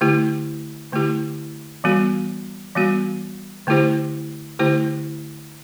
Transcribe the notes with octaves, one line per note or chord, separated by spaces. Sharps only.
D3 A3 E4 G4
D3 A3 E4 G4
E3 G3 B3 F#4
E3 G3 B3 F#4
D3 A3 E4 G4 C5
D3 A3 E4 G4 C5